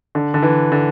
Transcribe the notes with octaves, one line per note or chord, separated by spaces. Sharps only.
D3
D3
E3
D3